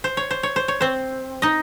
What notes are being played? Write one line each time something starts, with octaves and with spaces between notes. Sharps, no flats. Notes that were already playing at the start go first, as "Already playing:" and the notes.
C5
C#5
C5
C#5
C5
C#5
C4 C5
D#4 D#5